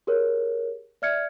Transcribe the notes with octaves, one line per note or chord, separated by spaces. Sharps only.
G4 G#4 A#4 C#5
D5 E5 F6 G#6 C#7